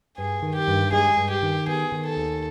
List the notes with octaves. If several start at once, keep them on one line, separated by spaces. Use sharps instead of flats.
G2 G#4
D#3
G4
G2
G#3 G#4
G2
G4
D#3
B3 G#4
D#3
A4
D#2